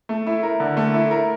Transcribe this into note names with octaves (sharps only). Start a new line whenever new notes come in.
A3
E4
A#4
D3
A3
E4
A#4